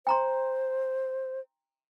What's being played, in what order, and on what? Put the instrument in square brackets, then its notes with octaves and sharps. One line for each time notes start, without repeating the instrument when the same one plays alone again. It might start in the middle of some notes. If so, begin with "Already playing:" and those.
[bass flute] C5 [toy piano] G5 A#5 C6